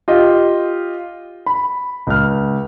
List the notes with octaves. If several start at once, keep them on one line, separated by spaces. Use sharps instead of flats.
F4 G4 D#5
B5
C#2 F6